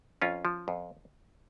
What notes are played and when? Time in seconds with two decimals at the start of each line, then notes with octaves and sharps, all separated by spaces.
0.22 F2 C#4 F4
0.45 F3
0.68 F2